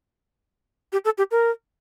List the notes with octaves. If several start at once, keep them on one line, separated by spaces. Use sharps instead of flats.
G4
A4
G4
A#4